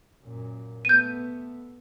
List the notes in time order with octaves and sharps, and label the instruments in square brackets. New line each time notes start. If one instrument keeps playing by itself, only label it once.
[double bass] F#2 A#2
[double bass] A3 B3 [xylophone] G6 D#7